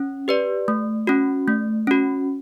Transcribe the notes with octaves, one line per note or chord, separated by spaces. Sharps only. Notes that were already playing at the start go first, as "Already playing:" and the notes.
Already playing: C#4
G4 B4 D5
A3
C#4 F#4
A3
C#4 F#4